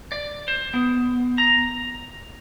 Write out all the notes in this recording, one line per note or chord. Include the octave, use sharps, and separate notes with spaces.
D5
C5
B3
A#5